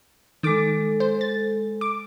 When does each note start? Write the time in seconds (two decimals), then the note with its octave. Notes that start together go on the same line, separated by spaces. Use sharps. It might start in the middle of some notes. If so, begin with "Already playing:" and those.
0.43 D#3 G#3 A4 D6
1.00 C5
1.21 A6
1.81 D6